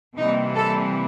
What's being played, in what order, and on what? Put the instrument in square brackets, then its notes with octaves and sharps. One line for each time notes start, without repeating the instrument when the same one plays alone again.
[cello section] C3 E3 G3 A#3 D#4
A4